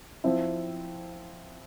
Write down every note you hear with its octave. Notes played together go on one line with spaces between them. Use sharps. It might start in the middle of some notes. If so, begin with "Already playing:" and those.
F3 C4 E4